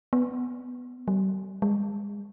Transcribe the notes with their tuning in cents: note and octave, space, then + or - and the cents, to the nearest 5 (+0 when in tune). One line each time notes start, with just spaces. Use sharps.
B3 +10
G3 -35
G#3 -30